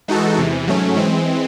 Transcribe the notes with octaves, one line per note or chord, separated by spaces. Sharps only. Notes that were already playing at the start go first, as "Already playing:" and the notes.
E3 G#3 D#4 F#4 A4
E2 C3 E3
G#2 F#3 A3 C#4
E3 G#3 C4